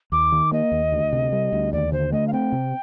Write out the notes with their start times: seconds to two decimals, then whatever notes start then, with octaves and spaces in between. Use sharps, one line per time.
0.12 D#2 D6
0.32 D#3
0.52 A#3 D#5
0.72 D#2
0.92 D2
1.13 C3
1.32 G3
1.53 D2
1.73 D#2 D5
1.92 D3 C5
2.12 A3 D#5
2.27 F5
2.33 C4 G5
2.52 C3